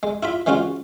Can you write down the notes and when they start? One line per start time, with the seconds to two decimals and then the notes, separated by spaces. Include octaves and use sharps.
0.03 G#3
0.23 E4 F4 B5
0.46 E3 G#3 C#4 F4 F#4